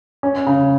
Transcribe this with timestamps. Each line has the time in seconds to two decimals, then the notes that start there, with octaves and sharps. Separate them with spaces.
0.23 C#4
0.46 C#3